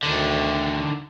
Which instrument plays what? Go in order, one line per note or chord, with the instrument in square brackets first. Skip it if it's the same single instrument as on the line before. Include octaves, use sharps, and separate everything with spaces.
[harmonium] D2 [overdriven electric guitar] D3 D#3